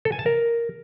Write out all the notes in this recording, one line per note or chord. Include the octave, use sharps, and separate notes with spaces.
A4
G#5
A5
A#4